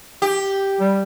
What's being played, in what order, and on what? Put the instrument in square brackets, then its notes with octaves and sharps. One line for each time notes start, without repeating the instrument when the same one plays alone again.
[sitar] G4
[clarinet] G3